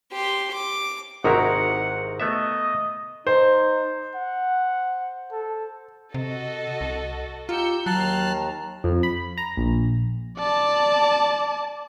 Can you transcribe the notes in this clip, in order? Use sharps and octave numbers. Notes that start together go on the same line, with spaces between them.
G4 C6
D6
G#1 C3 D#4 E4 F#4 A#4 F#5
A3 B3 D#5 E5
D#4 C5
F#5
A4
C3 F#4 A4 D#5
C2
F4 G4 A#5 E6 G6 C#7
D#2 D#3 F#3 A5 A#5 F6 F#6 C7
F2
B5
A#5
A#1
D5 A5